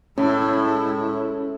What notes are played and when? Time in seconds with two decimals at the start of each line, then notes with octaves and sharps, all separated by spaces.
0.18 A2 G#3 C#4 E4